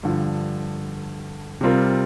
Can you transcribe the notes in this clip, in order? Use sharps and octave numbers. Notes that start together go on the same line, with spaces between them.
G2 D3 F3
C3 G3 C4 F4 A#4